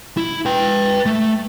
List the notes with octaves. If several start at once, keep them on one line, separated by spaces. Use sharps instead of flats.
E4
B4 G5
A3